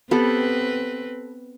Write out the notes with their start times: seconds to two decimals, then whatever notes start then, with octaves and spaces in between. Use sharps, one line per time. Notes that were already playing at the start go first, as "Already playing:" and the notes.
0.11 B3 C4 G4 A4 B4